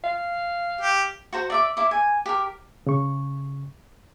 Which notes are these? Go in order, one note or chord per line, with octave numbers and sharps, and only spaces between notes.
F5
G4
F#4 C5 A#5
D5 E5 D6
E4 D6
G#5
G4 A#4
C#3 C#6